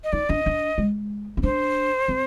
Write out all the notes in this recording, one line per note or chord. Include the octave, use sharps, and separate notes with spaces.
D#5
D#4 D5
D4 D#5
D4
G#3
C4
D4 C5
C4